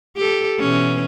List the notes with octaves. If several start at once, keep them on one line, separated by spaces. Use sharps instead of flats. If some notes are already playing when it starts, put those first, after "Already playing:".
G4 A4
B2 E3 C#4